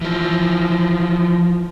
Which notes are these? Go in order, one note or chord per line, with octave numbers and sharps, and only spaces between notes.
E3 F3